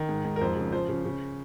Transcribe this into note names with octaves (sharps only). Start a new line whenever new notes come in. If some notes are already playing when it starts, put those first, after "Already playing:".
Already playing: D#3
G#2
G#2
A#4
F2 C5
C#3
F3 C5
C#3
C#3